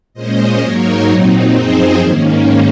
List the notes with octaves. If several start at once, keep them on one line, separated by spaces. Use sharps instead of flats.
A#2 G#3 C#4 C5 D#5
G#2 F#3 A#3 D#4 A#4 C#5
A#2 F#3 C4 D#4
F#2 F3 C4 D#4 G#4 C5
G#2 D#3 A#3 C#4